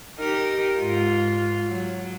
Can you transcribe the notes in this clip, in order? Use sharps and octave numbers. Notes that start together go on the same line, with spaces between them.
D#4 G4 A#4
G#2 F4
F#3